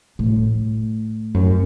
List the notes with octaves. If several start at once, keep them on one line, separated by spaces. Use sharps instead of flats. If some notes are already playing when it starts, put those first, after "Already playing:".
A2
F#2